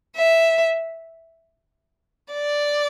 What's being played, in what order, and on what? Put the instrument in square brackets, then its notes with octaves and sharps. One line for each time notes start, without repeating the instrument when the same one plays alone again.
[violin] E5
D5